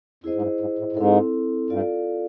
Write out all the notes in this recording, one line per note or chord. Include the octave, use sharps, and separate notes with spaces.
F2 E4 G#4 C5 D#5
G#2
G2
G#2
A2
A2
G#2 C4 E4 A4
G2 F4 A4 D5 F5